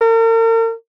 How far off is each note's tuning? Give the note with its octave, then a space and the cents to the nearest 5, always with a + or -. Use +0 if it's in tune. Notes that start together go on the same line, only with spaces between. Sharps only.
A#4 -45